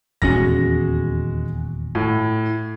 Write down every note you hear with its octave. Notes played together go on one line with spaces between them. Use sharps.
D#1 E2 G#3 C#4 F#4 A#6
A2